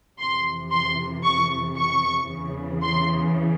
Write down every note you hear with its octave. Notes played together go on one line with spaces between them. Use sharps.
F2 C3 E3 C6
C6
C#6
C#6
E2 C#3 E3
C6